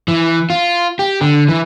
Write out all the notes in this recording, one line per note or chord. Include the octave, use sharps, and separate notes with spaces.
E3
F4
G4
D3
E3